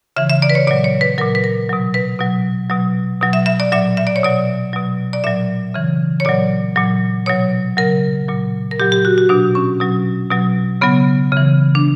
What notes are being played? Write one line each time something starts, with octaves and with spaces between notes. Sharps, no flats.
C#3 E3 E5
E5
D5
B4
C#5
A#2 F#3 D5
C#5
B4
A#2 F#3 A#4
B4
A#4
B2 F#3
B4
B2 F#3
B2 F#3
B2 F#3
E5
E5
D5
A#2 F#3 E5
E5
D5
C#5
B2 F#3 D5
B2 F#3
D5
A#2 F#3 E5
C#3 E3
C#5
A#2 F#3 D5
A#2 F#3
B2 F#3 C#5
C#3 F#3 A#4
A#2 F#3
A#4
A#2 F#3 G4
G4
F#4
F#4
B2 F#3 D4
C#4
B2 F#3
B2 F#3
C#3 F#3 B3
C#3 E3
D4